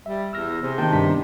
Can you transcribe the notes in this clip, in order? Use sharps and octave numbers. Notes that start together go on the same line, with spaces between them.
G3 E5
E2 E6 F6 A#6
C3 G#4
D#3 A#3 G5 A5 G6
E2 G2 D4 G4 B6